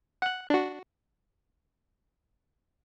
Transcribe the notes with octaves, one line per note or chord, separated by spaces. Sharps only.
F#5 F#6
D4 F#4